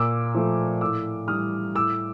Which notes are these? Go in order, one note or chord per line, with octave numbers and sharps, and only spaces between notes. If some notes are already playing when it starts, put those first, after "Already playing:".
Already playing: A#2 D6 E6
F3 A3
A2 D6 E6
E3 G3 D#6 F6
A2 D6 E6